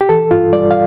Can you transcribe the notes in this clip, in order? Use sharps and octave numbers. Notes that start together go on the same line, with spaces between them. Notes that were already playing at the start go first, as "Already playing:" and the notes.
G4
E3 A4
G2 F4
G3 D5
F5